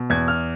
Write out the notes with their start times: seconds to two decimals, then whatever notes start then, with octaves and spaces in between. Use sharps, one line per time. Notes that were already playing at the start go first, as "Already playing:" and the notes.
Already playing: B2
0.10 E2 G#6
0.28 F6